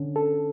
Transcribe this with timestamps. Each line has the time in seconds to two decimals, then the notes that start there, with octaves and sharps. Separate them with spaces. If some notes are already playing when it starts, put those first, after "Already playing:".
Already playing: D3 C#4
0.16 A4